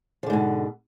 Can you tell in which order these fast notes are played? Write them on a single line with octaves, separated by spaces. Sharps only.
F3 D3 G#2 B2